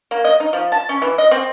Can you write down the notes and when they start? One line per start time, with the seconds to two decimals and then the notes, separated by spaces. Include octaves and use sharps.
0.11 A#3
0.24 D#5
0.40 D#4
0.53 F3
0.72 A5
0.89 C#4
1.02 E3
1.18 D#5
1.31 C4